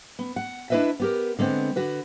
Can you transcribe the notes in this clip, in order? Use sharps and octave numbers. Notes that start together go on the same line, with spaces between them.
B3
F#5
D4 E4 G#4 B4 D#5 E5
B3 G4 A#4
D3 G#3 B3 C4
D3 F#4 B4